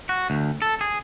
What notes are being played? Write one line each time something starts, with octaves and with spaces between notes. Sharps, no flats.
F#4
D2
A4
G#4